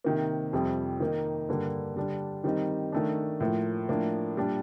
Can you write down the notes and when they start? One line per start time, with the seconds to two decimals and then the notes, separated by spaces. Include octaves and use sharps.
0.04 C3 D#3 A#3
0.53 F2 C3 G3 C4
1.00 D#3 A#3 D#4
1.49 G2 D3 G3 A#3
1.96 D3 G3 D4
2.44 D#3 G3 C4 D#4
2.92 D#3 A3 D4
3.40 A2 F3 A#3
3.89 A2 F3 A#3 D4
4.37 A#2 G3 D4